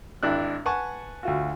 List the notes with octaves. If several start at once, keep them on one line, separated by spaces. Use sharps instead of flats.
G#1 D4 E4 F#6
B4 F#5 G#5 A5 C#6
D2 F4 F#4